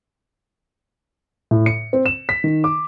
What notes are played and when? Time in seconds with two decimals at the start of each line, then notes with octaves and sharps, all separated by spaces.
1.51 A2
1.66 C#7
1.93 C4
2.06 E7
2.29 B6
2.44 D#3
2.64 D6